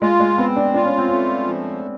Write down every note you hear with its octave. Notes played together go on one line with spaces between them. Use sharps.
G#3 F4
G#3
B3 C4
D4
D4 F4
C#4
C4
A3 C#4
F3